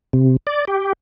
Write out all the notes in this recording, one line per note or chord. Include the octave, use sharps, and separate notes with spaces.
C3
D5
G4